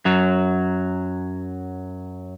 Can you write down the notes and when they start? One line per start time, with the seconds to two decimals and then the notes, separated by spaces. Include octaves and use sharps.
0.05 F#2 F#3